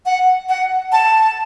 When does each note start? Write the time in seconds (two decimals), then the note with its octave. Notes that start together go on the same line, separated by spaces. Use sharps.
0.06 F#5
0.49 F#5
0.92 A5